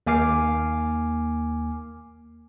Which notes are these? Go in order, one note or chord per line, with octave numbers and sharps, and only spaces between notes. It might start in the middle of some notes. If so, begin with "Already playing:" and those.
D#2 A#3 G#5 D6 F6 C7